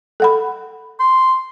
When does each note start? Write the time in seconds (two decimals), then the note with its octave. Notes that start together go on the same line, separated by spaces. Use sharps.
0.20 A4 F#5 B5
1.00 C6